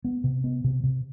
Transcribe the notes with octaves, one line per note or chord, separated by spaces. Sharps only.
B3
C3
B3
C3
C3